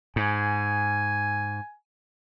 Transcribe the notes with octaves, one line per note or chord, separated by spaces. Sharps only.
G#2 G#5